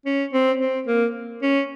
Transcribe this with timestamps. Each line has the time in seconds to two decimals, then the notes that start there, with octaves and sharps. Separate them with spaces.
0.06 C#4
0.33 C4
0.60 C4
0.87 A#3
1.42 C#4